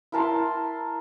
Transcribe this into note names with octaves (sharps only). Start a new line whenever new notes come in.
E4 A#4 A5 C6